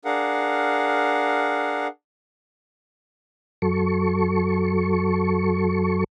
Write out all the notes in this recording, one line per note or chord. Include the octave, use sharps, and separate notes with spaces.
D4 G#4 A#4 F5 F#5
F#2 F#3 A4 C#6